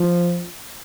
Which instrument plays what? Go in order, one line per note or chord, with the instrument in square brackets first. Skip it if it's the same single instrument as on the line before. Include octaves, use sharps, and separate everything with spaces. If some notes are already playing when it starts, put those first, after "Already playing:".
Already playing: [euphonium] F3